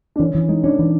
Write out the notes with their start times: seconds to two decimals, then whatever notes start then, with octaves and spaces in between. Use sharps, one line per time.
0.16 D4
0.19 E3 C#4
0.35 E3
0.49 G#3 D#4
0.63 C#4 D4
0.79 E3